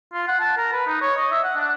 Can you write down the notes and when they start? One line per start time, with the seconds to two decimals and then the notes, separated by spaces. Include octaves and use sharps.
0.13 F4
0.28 F#5
0.40 A5
0.57 A#4
0.73 B4
0.87 D#4
1.01 C#5
1.16 D#5
1.31 E5
1.44 F#5
1.56 D4